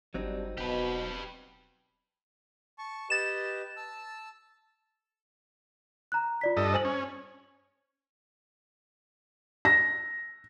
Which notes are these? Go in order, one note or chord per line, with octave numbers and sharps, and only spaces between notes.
G1 F#3 G3 C4 D4 D#4
E1 B2 G4 B4
A5 C#6
G4 B4 D#5 A6 E7
A5 E6
A#5 F#6
F4 D5 B6
G2 A4 D#5
C5 G#5 F#7
C#4
A#6